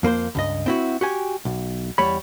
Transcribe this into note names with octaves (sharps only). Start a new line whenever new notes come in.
F2 A#3 B4 C5
C#2 G2 D#5
C4 E4 F#4
F#4 G4 G#5
B1
E2 G3 C#5 B5